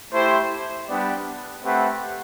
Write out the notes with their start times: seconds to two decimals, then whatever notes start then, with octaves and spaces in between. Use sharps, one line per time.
0.13 A3 E4 G4 C5
0.88 G3 B3 D4 G4 D5
1.62 A3 C4 G4 B4 F#5